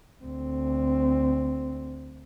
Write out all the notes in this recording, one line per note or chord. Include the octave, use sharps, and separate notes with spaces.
D2 C4